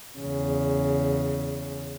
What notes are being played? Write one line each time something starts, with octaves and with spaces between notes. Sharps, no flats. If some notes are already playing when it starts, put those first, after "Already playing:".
E2 C#3